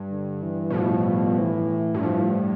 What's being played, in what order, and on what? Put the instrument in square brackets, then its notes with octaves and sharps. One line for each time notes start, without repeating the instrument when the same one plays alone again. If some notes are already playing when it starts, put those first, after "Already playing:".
Already playing: [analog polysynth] G2
[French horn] D3
E3
[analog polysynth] B2
[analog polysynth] A2 [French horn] F3
[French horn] F3
E3
[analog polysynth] G2
[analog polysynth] A2 [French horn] F3